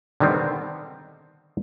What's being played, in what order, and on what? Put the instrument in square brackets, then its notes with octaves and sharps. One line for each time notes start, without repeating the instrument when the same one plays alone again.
[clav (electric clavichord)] D3 D#3 G3 B3 C4